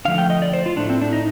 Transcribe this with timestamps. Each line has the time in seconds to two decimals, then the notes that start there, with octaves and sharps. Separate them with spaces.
0.05 D3 F3 A3 F5
0.18 G5
0.30 D#5
0.42 D5
0.54 C5
0.66 F4
0.77 A2 A3 D4
0.90 C4
1.02 D4
1.13 D#4